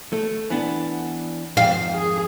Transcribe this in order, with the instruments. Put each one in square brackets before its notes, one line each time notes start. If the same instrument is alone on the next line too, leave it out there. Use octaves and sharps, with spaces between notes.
[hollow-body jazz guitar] A3
E3 B3 D4
[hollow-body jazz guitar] F2 G#2 D#3 [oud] F5
[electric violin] G#4